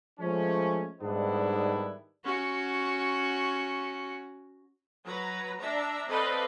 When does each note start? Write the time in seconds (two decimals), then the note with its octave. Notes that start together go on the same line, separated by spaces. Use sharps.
0.20 F3 G#3 A3 C#4
1.01 G#2 D#3 G3 B3 D4 E4
2.25 C#4 F#4
5.04 F#3 B4 A#5
5.58 D4 E5 A#5
6.08 C4 A4 B4 D5 D#5 F5